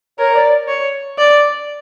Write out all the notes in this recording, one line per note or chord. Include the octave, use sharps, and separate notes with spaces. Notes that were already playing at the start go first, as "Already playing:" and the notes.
A#4 C#5
D5
C#5
D5